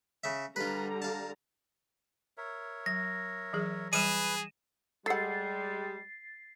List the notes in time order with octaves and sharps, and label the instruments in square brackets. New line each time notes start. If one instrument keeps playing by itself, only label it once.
[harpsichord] C#3 E5
[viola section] D3 G3 A#5 [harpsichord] F4 B4
[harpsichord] F5 A5
[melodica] A#4 C#5 E5
[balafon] F#3 [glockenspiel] A#6
[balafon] E3 F#3 G#4
[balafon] E3 G3 [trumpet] G#4 [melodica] B4 [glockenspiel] D#7 E7
[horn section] G3 G#3 [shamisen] A4 F#5 [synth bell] A6 C7